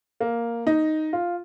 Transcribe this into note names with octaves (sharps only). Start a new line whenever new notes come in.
A#3
D#4
F4